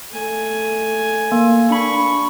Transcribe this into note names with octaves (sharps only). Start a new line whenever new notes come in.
A3 G#5
A#3
D4 B5 C#6